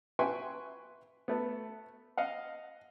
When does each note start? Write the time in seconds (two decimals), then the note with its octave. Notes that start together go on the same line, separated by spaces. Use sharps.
0.19 B4 E5 G5 G#5 C6 C#6
1.28 A3 B3
2.17 D#5 F5 F#5